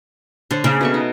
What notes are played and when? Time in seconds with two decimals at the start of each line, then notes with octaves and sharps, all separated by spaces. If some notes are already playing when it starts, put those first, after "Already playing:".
0.51 D3 D4 C5 C#5
0.64 C#3 A#3
0.81 B2 A3 C#6
0.94 D#4